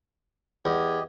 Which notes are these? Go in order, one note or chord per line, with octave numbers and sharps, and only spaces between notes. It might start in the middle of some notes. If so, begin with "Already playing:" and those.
E2 G4 D#5